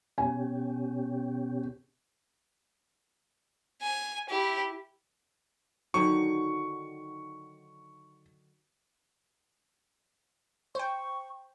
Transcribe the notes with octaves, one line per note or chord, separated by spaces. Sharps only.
B2 C#4 G4 G#5
G#5
E4 G4
D3 D#3 F#3 D#4 C#6
C5 G5 C#6